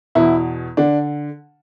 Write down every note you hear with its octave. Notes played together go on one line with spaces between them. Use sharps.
E2 B2 E4
D3 D4